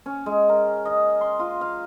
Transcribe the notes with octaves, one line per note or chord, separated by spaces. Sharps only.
C#4
G#3
A#4
D#5
C6
F4
F5